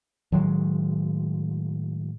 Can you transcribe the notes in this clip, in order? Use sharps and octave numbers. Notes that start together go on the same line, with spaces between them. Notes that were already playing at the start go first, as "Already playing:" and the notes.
A2 D#3 F#3 G#3